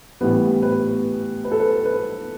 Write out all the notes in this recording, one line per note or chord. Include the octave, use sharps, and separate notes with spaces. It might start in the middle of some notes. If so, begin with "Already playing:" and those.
A2 E3 G3 B3 B4
B4
B4
A4
B4
B4